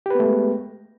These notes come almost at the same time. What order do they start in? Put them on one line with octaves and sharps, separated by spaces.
G4 B4 B3 A3 G#3